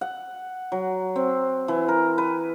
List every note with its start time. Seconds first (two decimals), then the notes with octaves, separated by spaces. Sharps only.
0.01 F#5
0.72 F#3
1.16 C4
1.68 E3
1.88 A#4
2.18 B4